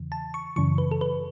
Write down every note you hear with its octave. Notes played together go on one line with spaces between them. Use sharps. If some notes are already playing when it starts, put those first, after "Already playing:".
Already playing: E2 C#3 E3
A5
C#6
F#2 C#3 E3 C#6
B4
A4
B4